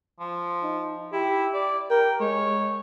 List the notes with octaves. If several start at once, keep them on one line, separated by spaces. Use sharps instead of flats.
F3
D#4
E4 G4
D5
A#4 G5
G#3 C#5